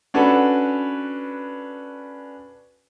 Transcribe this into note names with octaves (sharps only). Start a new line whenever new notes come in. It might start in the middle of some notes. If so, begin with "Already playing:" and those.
C#4 D4 F#4 A4 B4